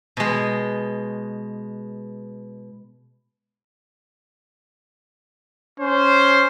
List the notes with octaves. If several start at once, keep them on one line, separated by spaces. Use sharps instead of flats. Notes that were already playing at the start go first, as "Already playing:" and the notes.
B2 G#3
C#4 C5